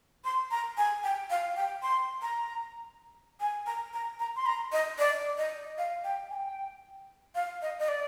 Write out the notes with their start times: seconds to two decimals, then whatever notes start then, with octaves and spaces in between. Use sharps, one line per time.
0.25 C6
0.51 A#5
0.77 G#5
1.04 G5
1.30 F5
1.56 G5
1.83 C6
2.22 A#5
3.40 G#5
3.67 A#5
3.93 A#5
4.19 A#5
4.36 C6
4.46 A#5
4.72 D#5
4.98 D5
5.38 D#5
5.78 F5
6.04 G5
6.30 G#5
6.34 G5
7.35 F5
7.62 D#5
7.79 D#5
7.88 D5